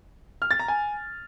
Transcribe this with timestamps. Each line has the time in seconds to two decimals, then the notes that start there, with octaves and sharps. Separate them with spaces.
0.42 F6
0.51 A6
0.59 A#5
0.68 G#5